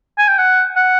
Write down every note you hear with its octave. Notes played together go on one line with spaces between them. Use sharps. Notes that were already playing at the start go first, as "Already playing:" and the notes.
G#5
G5
F#5
F#5